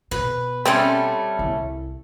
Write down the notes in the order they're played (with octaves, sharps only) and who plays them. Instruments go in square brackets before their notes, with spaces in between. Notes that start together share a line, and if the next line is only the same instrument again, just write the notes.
[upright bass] B2 [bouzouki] B4
[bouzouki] G3 A3 C#4 [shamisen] C4
[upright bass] C2 E4